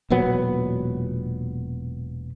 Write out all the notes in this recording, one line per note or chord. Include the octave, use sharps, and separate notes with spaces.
E1 A#2 F#3 B3